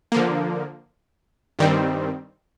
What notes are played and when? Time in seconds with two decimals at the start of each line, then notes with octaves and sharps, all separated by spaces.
0.12 D3 F3 A#3
1.59 G2 D#3 G3 C4